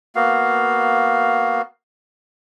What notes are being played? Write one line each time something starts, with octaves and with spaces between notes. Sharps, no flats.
A#3 B3 F#4 F5